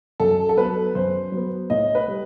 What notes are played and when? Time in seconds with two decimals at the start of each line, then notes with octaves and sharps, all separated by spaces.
0.20 F#2 A4
0.49 A4
0.57 F#3 B3 B4
0.95 F#2 C5
1.32 F#3
1.37 B3
1.70 A2 D#5
1.95 B4
2.08 G3